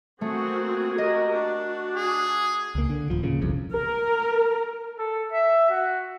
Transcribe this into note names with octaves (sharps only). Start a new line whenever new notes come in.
A3 A#3 C4 F#4 G#4
F#4 G4 A#4 D#5
D4 F#4
G#4
C#2 A#3
D3
D1 F3
D1 A#2 C#3
F#1 C2 F2
A#4
A4
E5
F#4